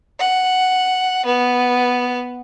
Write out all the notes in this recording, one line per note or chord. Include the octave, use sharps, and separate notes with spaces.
F#5
B3